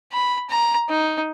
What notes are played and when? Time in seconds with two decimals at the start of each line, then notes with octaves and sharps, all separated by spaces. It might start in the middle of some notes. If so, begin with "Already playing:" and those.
0.12 B5
0.49 A#5
0.89 D#4